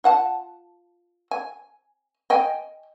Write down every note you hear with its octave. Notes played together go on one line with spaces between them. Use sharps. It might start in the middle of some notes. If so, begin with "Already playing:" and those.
F4 F#5 A5
G#5
D#5 G5 G#5